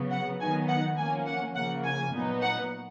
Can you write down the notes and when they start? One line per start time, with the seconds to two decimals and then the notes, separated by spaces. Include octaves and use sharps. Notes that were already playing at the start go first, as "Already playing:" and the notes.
Already playing: C#3 F#3 B3
0.11 F#5
0.40 D#3 F#3 B3 D#4 G#5
0.69 F#5
0.98 F3 A#3 C#4 G#5
1.27 F#5
1.55 C#3 F3 A#3 F#5
1.84 G#5
2.13 A#2 F#3 B3 D#4
2.42 F#5